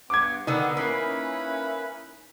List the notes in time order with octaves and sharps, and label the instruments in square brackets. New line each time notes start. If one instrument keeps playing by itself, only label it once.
[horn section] G2 B3 [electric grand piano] D6 G#6
[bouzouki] D3 D#3 [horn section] B3 [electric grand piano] D#4
[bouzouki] A#3 [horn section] C#4 E4 B4